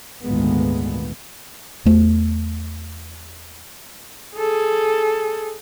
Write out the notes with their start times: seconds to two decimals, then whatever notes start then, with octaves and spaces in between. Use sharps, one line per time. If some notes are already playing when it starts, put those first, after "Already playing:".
0.22 G#1 D2 A#2 D#3 G#3 B3
1.85 E2 A3
4.35 G#4 A4